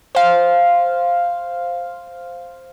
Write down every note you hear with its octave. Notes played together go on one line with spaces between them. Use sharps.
C5 F5